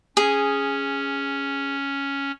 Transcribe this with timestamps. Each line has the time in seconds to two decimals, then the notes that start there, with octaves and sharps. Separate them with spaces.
0.17 C#4 G#4